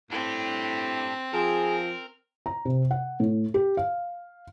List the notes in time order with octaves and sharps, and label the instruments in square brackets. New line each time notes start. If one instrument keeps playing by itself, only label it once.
[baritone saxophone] A2 [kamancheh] C4 [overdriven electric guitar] D4 G4
[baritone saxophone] F3 [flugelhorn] G#4 [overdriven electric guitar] A#4
[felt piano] A#5
C3
F#5
A2
G4
F5